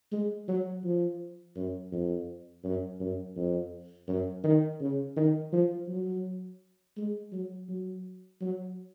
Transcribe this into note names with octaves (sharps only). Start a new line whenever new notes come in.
G#3
F#3
F3
F#2
F2
F#2
F#2
F2
F#2
D#3
C#3
D#3
F3
F#3
G#3
F#3
F#3
F#3